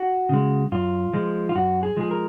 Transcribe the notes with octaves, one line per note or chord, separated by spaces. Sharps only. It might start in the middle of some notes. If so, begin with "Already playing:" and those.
Already playing: F#4
C#3 G#3
F#2 F4
F3 G#3
F4
F#2 F#4
G#4
F3 G#3 G#4
A#4